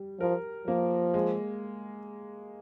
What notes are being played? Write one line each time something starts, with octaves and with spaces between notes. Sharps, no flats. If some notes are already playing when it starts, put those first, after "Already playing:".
Already playing: G3
F3 A#4
F3 A#3
G#3